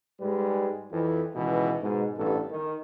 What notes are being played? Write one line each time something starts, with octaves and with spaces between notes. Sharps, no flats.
G#2 G3 G#3 B4
F2 E3
C#2 B2 D#3 E3
G#2 B2
A1 G2 B3 A4
D#3